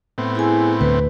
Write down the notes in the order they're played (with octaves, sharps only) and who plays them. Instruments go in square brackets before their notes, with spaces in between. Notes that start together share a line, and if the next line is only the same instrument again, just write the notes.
[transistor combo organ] A2 B3 C4
[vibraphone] E4 G#4 G#5
[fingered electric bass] D2 [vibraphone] B4